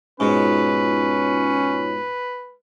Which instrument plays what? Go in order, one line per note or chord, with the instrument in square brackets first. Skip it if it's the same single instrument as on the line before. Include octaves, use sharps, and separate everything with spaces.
[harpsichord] G#2 B2 [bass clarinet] C#4 [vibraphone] D#4 F4 C#5 [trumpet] B4